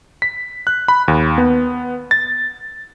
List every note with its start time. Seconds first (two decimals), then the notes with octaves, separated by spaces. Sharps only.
0.22 B6
0.67 F#6
0.88 B5
1.08 D#2
1.38 B3
2.11 A6